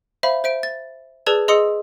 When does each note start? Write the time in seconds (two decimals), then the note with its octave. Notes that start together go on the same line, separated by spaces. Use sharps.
0.23 C5 E5 F5 B5
0.44 C5 E5 D7
0.63 A6
1.26 G#4 B4 D5 A5 E6 G#6
1.48 G#4 D#5 C6 D#6 E6 C#7